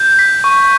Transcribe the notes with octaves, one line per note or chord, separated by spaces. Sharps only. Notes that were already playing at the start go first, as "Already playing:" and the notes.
Already playing: G6
B6
C#6